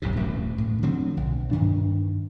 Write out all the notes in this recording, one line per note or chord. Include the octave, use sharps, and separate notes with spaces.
E1 B1 G#2 C3
D#1 A1 F#2
A2
D3 F3 F#3 C4
B1
G2 D#3 D4